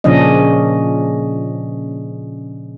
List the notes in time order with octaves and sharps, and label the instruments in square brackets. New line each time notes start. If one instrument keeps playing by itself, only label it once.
[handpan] A#2 C#3 F3 C#4 D4 D#5